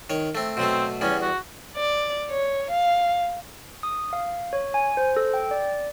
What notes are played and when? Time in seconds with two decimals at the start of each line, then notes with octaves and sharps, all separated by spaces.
0.10 D#3 C#5
0.35 A3 C4
0.57 B2 F#3 A3 C4
1.01 E2 G3 B3 C#4
1.22 F#4
1.76 D5
2.30 C#5
2.71 F5
3.83 D#6
4.13 F5
4.53 C#5
4.74 G#5
4.97 C5
5.16 A4
5.34 G5
5.51 D5